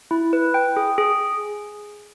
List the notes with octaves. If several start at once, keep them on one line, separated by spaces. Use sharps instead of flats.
E4
B4
G5
G#4
G#4